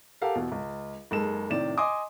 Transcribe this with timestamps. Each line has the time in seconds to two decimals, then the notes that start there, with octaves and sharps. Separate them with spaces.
0.22 G4 A4 A#4 F5 F#5
0.35 E2 B2
0.52 C#2
1.11 F#1 G#3 D#4 A4 E7
1.50 A2 C3 D#3 D5 E7
1.78 D#5 G#5 C6 D6 D#6